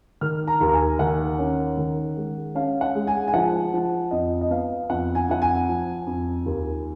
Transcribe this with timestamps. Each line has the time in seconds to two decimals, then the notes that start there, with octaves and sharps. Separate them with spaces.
0.21 D#3 F6
0.47 A#5
0.61 D#2
0.69 A#5
0.74 G#5
0.99 D#3 F#5
1.39 C#4
1.77 D#3
2.17 G#3
2.55 C#4 F5
2.81 F#5
2.95 G#3
3.07 G#5
3.28 G#5
3.34 F3 F#5
3.73 F3
4.11 F2 D#5
4.41 D#5
4.50 B3 F5
4.90 F2 F#5
5.15 G#5
5.29 F2 F#5
5.42 G#5
5.68 F3
6.07 F2
6.46 D#2